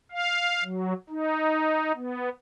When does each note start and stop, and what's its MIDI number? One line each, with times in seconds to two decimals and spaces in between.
0.11 0.63 77
0.64 0.93 54
1.10 1.92 63
1.95 2.29 59